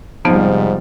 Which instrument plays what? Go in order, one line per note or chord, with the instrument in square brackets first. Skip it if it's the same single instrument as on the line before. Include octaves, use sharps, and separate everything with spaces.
[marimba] F2 B3 D#4 [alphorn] G#2 [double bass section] C3 G3 [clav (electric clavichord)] F3